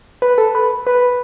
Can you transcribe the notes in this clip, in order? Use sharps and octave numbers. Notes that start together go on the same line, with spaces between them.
B4
A4
B4
B4